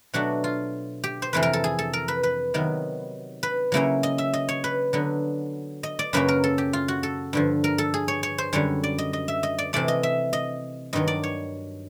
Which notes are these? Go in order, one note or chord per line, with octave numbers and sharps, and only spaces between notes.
B2 F#3 A3 D4 F#4
F4
G4
C5
F2 C3 E3 B4
A#4
A4
G#4
A4
A#4
B4
B4
C3 D#3 F#3 B3
B4
C#3 F#3 A#3 C#4 E4
D#5
E5
D#5
C#5
B4
D3 F#3 B3
D#5
D5
F#2 C#3 F#3 A#3 C#4 B4
A#4
A4
G4
F4
F#4
A4
G2 D3 F3
A#4
A4
G#4
C#5
C#5
C5
F#2 D3 G3 C#5
D5
D#5
D#5
E5
D#5
D5
C3 E3 A3 D5
D#5
E5
D#5
G2 D#3 F#3 D#5
D5
C#5